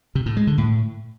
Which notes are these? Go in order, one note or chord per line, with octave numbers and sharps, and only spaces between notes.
C3
A2
G#3
D3
A2